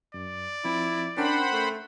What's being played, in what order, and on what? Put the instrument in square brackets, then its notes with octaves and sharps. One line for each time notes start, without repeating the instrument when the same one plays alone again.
[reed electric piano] F#2 [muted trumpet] D5
[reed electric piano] F3 C4 [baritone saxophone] E4
[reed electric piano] C#4 A#4 G5 [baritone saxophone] D4 [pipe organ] C5 F#5 B5
[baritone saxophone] A3